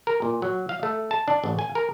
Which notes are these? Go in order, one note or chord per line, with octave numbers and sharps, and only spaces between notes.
A#4
A#2
F#3
F5
A3
A5
D4
A1
G#5
A#4